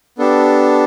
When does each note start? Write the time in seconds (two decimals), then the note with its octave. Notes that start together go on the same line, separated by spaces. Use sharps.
0.18 B3 D4 G4 A4